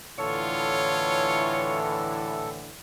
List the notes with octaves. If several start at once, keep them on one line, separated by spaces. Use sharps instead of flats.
A2 D3 E3 F4 A4 C#5